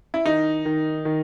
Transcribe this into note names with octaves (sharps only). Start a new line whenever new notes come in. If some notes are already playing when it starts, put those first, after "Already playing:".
E4
D#3 D#4
D#3
D#3